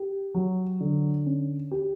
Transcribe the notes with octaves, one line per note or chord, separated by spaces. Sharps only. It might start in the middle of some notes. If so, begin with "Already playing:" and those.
Already playing: G4
F#3
D3
C#4
G4